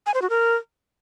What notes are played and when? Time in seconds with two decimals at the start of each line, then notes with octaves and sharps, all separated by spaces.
0.06 G#5
0.14 C5
0.22 F#4
0.30 A#4